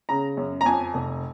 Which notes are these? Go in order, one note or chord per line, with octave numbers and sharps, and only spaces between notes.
C#3 A#5
F#2
A#5
F2 G#5
F1